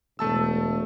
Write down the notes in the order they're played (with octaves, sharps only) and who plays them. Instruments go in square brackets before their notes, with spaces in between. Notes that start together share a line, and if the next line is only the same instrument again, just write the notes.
[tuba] E1 [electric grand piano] A3 A5 E6